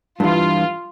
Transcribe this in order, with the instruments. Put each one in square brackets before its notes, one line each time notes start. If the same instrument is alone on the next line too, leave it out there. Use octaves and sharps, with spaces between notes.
[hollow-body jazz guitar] G2 E3 [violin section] F4